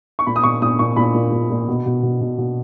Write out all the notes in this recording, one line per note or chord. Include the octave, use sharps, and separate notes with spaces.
C#6
A#2 B5
D#6
A#2 C#6
A#2 D#6
A#2 C#6
A#2 B5
A#2
A#2
A#2
B2
B2
B2
B2
B2